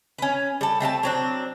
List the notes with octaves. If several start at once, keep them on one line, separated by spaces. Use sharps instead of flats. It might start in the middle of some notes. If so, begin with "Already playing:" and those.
C#4 B4
G3 A4
A3 C4 F5 A5
F#3 C4 D4